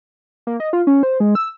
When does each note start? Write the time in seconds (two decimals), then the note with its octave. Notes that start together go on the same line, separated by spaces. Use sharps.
0.47 A#3
0.60 D#5
0.73 F4
0.87 C#4
1.03 C5
1.20 G#3
1.35 E6